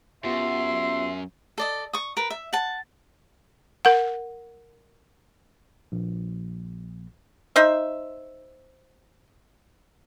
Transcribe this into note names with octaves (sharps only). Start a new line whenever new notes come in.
F#2 B3 F4 G4 E5 C6
A4 D5 D#5
C#6 D#6
A#4 B4
E5
F#5 A5
A#4 F#5
A#1
D#4 C5 E5